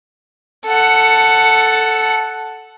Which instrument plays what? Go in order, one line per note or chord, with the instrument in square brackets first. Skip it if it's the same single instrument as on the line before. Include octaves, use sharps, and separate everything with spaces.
[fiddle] A4 F#5